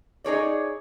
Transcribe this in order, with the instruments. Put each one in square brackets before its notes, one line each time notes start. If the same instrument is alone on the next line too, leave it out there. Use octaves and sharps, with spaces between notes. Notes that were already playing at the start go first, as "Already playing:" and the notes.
[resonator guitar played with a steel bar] D#4 G#4 C#5 D5